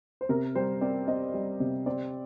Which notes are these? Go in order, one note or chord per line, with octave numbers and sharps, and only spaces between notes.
C5
C3 A#4
G3 C5
C4 D5
C4 D#5
G3
C3
C4 D5